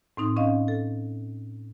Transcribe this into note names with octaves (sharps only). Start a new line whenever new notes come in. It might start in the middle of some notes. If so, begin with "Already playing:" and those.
A2 C4 D#4 C6
C#4 D#5 F5
A4